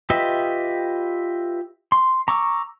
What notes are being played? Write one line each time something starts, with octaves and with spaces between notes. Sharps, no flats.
F4 G4 B4 D#5 E5
C6
A#5 C#6 D6 E6